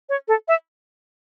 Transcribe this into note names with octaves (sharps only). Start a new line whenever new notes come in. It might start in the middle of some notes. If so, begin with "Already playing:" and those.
C#5
A4
E5